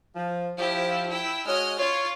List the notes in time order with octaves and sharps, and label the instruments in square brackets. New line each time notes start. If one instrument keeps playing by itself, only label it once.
[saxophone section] F3
[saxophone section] F3 [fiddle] E4 G4
[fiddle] E4 G5
[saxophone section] G#3 F#4 C#5 [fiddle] D#5 F6
[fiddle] F4 [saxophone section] C#5